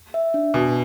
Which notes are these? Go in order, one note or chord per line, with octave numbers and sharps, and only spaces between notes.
E5
D4
B2 G#5